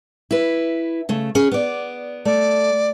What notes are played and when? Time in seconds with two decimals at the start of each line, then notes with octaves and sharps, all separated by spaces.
0.31 E4 B4
1.09 C#3 A3
1.35 C#4 G#4 C#5
1.52 B3 D5
2.25 A3 D5